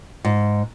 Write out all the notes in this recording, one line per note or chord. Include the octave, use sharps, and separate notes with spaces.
G#2